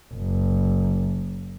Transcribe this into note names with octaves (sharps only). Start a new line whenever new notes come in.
F#1